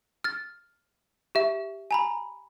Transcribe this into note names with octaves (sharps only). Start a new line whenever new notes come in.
F6 A6
G4 E5
G#5 A#5 B5